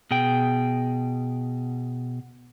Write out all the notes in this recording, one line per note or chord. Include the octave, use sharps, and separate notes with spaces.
B2 G#4 G5